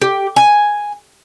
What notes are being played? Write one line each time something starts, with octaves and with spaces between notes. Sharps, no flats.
G4
G#5